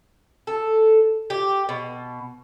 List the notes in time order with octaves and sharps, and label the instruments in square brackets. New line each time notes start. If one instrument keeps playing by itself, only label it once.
[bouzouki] A4
G4
B2